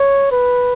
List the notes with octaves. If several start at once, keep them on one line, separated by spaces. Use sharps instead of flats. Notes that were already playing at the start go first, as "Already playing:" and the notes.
Already playing: C#5
B4